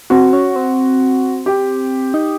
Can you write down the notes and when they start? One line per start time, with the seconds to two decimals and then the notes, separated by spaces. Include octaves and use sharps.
0.10 C4 F#4
0.33 C#4
0.56 C4
1.46 G4
2.14 D#4